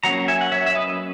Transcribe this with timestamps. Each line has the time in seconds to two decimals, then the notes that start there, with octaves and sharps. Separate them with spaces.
0.03 F#3 A#3 C#4 F#5 A#5
0.28 E5 G#5
0.41 F#5
0.52 C#5 E5
0.66 E5
0.75 B4 D#5